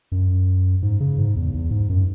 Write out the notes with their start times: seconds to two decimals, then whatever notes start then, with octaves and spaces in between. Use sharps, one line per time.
0.12 F#2
0.82 G#2
1.00 C#3
1.18 G#2
1.36 E2
1.54 E2
1.71 G#2
1.89 F#2